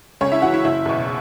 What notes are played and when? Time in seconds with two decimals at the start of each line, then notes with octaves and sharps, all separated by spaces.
0.21 C#2 C#4 C#5
0.32 E4 E5
0.42 C#3 E3 F#4 F#5
0.54 E4 E5
0.64 F#1 E4 E5
0.85 E2 B2